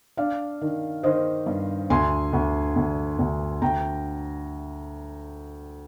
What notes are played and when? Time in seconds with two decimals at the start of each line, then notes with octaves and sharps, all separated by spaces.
0.17 D4 D5 F5
0.61 D#3
1.03 D#3 C5 D#5
1.46 G2
1.90 D2 G#5 C6
2.33 D2
2.76 D2
3.19 D2
3.61 D2 G5 A#5